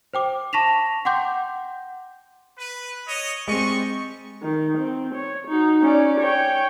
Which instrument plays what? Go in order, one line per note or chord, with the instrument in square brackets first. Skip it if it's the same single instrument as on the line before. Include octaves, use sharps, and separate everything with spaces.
[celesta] C5 G5 D6
A5 C#6 A#6 B6 E7 F7
F#5 G5 C6 D6 G6
[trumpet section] B4
C#5 D#5
[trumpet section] G3 D#5 C#6 [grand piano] G#3 C4
[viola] D#3
C4
C#5
D#4 F#4
C#4 D5
C#5 G5